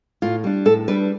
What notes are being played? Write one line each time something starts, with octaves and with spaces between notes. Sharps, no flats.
A2 F4
G3 D4
A2 A4
G3 D4 B4